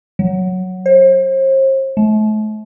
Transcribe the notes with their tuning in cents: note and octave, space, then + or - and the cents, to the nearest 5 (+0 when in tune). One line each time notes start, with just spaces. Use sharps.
F#3 +0
C5 +40
A3 -40